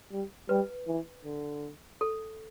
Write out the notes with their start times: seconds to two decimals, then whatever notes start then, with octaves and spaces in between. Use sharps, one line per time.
0.11 G3
0.49 G3 B4
0.87 E3
1.25 D3
2.01 A4